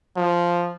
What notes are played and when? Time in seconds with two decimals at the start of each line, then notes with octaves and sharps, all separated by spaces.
0.16 F3